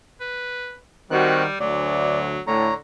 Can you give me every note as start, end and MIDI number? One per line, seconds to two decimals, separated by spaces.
0.20 0.77 71
1.11 1.45 51
1.11 1.58 55
1.11 1.43 60
1.11 1.45 66
1.11 1.43 90
1.60 2.37 38
1.60 2.41 54
1.60 2.19 74
2.47 2.69 45
2.47 2.77 50
2.47 2.74 73
2.47 2.74 82